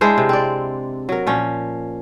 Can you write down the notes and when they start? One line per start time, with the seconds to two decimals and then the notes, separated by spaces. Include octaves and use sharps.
0.01 G#3 D4 E4 C5
0.18 C3
0.29 C4 D5
1.09 F#3 A#4
1.27 A#2 F3 C#4